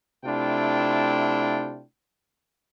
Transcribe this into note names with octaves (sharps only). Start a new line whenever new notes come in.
C3 A3 D4 E4 F4 G5